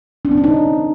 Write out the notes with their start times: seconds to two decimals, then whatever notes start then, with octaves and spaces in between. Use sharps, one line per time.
0.25 D4
0.31 C4
0.37 C#4
0.44 D#4